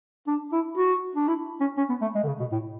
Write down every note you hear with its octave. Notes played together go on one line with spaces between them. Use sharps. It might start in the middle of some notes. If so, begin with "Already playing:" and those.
D4
E4
F#4
D4
E4
C#4
C#4
B3
A3
G#3
D3
C#3
B2
A2